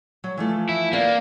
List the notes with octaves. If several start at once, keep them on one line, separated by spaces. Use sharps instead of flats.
F#3
E3 F3 A3
E4
A#3 B3 D4